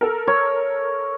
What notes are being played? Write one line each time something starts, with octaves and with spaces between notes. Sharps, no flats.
A4 A#4
C#5